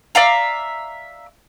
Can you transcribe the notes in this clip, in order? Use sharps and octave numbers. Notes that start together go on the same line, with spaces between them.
D5 E5 F5 A#5